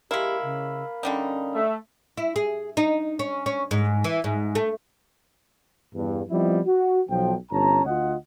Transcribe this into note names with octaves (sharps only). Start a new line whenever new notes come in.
G#3 E4 G4 A#4 F5 B5
C#3
D3 G3 C#4 D#4
A3 E5
E4
G#4
D#4
C#4
C#4
G#2
E3
G#2
A3
E2 G2
F3 G3 B3 C4 E4 D#5
F#4
B1 F3 G5
G1 C#4 A5 A#5
D2 F4 D#5 F#5